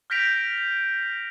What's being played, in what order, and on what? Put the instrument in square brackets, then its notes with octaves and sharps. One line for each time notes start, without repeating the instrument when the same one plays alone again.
[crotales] F6 G6 A#6 B6 D7 F7